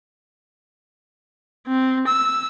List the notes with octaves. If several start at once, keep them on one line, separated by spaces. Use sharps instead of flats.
C4
E6